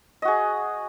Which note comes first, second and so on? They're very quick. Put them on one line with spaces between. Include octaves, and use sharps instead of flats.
D#5 F#4 G#4